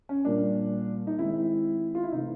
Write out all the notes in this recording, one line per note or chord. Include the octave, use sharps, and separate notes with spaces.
C#4
A#2 G3 A#3 D4
D#4
D#3 G#3 C4 E4
F4
E4
C3 E3 A3 D#4